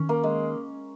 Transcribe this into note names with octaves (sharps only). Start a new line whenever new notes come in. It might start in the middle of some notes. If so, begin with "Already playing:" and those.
Already playing: D#3 C#4
A#3
G#3